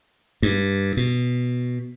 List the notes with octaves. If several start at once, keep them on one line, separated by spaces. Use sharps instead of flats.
G2
B2